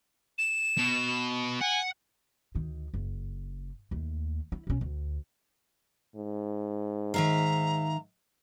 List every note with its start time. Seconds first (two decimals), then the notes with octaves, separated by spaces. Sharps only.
0.38 E7
0.78 B2
1.61 F#5 G#5
2.55 D2 D#3
2.94 F#1
3.91 D#2 A3
4.52 E4
4.67 B1 C#4
4.81 D2
6.16 G#2
7.14 D#3 E5 F5 A#5